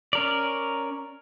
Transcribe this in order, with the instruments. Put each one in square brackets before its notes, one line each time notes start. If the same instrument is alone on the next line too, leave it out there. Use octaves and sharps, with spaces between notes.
[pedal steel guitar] C#4 A#4 D5